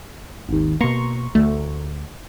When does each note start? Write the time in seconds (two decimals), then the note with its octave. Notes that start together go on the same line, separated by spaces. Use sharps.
0.49 G#1 D#2
0.81 B2 A#3 A#5 C6 C#6
1.35 D2 A3